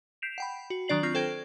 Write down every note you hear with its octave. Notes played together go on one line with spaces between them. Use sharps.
G6 B6 C7 D7 E7 F7
F#5 G5 B5
F#4
D#3 F#3 D4 D5 C7 F#7
C4 F4 C#6 F6 A#6
A4 C5 G5 G#6 D7